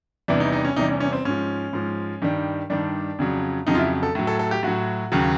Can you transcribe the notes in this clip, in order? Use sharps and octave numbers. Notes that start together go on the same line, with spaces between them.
E2 C3 E3 G3 D4
D#4
D#4
C#4
E2 C3 E3 G3 D#4
C#4
C#4
C4
G#2 F3 C#4
G#2 F3
G2 D#3 G3
G2 D#3 G3 D4
F2 C#3 F#3
F2 C#3 F#3 D#4
F4
E4
A4
A2 F#3
A4
A4
G4
A2 F#3 F#4
D#2 C#3 F#3